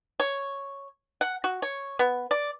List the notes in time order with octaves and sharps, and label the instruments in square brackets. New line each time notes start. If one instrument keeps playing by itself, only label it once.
[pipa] C#5
F#5
F#4
C#5
B3
D5